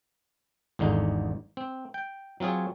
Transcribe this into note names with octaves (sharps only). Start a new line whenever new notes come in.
G#1 E2 D3 D#4
C4
G5
F#3 C4 F4 G#4 C#5